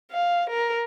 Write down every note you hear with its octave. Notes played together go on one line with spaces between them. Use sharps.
F5
A#4